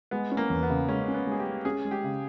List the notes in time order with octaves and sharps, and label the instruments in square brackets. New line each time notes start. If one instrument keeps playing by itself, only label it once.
[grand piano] G#3 [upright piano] B3
[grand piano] C#4
[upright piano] A#3
[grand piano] E2
[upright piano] B3
[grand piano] C#3
[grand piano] G#3 [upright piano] C#4
[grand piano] C#4
[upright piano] B3
[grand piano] G#3 [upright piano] G#4
[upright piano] G4
[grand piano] G#3
[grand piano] C#4 [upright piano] G#4
[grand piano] G#3
[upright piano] G4
[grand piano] C#3